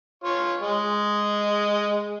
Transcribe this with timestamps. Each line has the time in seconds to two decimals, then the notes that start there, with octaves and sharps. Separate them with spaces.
0.24 F4 C#5
0.60 G#3